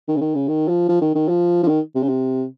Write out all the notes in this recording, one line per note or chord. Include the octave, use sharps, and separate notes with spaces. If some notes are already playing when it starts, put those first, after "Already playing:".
D#3
C#3
D#3
C#3
D#3
F3
F3
D#3
D#3
F3
F3
D#3
C3
C#3
C3